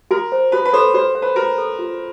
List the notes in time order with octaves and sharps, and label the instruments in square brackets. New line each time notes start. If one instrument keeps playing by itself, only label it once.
[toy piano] F#4 [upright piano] A#4
[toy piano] C5
[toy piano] F#4 [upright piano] B4
[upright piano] B4
[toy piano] A4 [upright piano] C5
[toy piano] F#4 [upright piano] C5
[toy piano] C5
[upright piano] B4
[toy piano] F#4 [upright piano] A#4
[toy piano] A4
F4